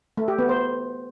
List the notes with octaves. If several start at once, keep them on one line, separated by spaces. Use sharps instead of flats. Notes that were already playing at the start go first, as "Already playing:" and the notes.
A3
G4
B3
C5